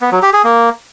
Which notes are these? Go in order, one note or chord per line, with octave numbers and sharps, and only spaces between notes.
B3
F#3
G4
G#4
A#3